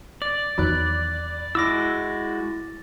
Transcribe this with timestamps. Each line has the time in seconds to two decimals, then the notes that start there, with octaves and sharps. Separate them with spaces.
0.22 D5 A6
0.58 E2 D#3 F#3 B5 F#6
1.55 G#3 E4 F#4 D6 E6 A#6